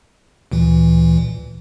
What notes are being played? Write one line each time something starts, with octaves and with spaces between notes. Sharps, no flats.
D2 A#2 E3